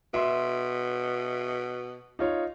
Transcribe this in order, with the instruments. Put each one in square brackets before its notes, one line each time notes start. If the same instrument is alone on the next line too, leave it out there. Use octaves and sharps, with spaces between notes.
[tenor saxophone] B2 [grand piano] E5 C6
[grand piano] D#4 F4 C#5